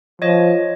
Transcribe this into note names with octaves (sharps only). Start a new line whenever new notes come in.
F3 C#5 D#5